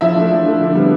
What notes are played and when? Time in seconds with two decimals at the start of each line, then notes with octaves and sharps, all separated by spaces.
0.01 F3 E4 E5
0.16 A3 D4
0.31 F3
0.46 A3 D4
0.61 D3
0.75 G3 B3